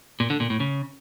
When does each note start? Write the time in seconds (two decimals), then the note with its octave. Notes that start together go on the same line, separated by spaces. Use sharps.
0.20 A#2
0.30 D3
0.40 A#2
0.50 A2
0.60 C#3